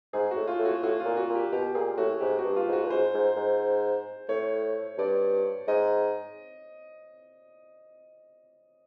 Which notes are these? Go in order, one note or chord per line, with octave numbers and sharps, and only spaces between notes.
G#2 G#4
F#4
A2
F4
A2
F#4
A2 F#4
F4
A#2
F#4
A#2
G4
B2 G4
A#2 G#4
A2 F#4
G#2 G4
F#4
G2
F4
G#2 F#4
G2
G#2 C5
G#2
G#2
A2 C#5
G2 D5
G#2 D#5